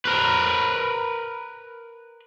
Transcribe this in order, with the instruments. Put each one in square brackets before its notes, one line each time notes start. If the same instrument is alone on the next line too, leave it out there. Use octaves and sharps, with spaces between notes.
[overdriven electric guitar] A#4 B4